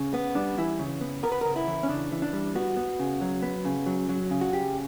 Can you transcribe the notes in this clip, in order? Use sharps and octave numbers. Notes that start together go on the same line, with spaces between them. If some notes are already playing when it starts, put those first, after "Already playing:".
Already playing: C#3
B3
G3 D4
E3 E4
C#3
B3
B3 A#4
B4
C#3 A#4
E4
E3
C#4
C#3 D4
E3
D4
G3
B3 F#4
B3
C#3
F#3
B3
C#3
F#3
F#3
C#3
F#4
C#3 G4